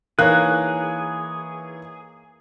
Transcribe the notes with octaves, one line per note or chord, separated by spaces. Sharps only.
E3 A#3 D#4 G#4 C#5 F#6